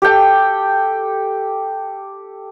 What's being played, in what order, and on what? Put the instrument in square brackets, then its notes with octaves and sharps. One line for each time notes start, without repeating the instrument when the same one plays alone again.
[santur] G4 A4 G5